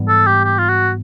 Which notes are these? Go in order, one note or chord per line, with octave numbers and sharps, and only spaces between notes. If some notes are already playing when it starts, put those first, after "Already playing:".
Already playing: G#2 E3 G3 B3
A4
G4
G4
F4
F#4